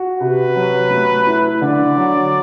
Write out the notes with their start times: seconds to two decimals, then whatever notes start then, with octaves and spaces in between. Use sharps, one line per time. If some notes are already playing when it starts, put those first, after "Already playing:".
Already playing: F#4
0.20 C3 B4
0.56 F#3
0.90 A3
1.27 E4
1.61 D3 D5
1.97 F#3